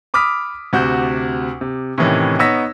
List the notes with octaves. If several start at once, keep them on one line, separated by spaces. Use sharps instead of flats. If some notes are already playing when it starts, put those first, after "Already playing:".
B5 D6 D#6 F6 B6
D2 C3 F#4 G6
C3
A2 C3 D#3 E3 C#4
B3 D#4 C#5 E6 A#6 B6